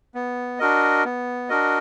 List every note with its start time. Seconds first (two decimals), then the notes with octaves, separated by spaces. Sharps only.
0.15 B3
0.59 D4 F#4 A#4 D#5
1.05 B3
1.49 D4 F#4 A#4 D#5